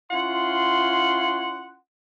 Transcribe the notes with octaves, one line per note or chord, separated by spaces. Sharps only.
C#4 E4 F4 F#5 C6